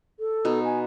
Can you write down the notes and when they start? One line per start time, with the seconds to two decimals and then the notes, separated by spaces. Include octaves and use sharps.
0.20 A4
0.45 B2 D#4
0.65 G#5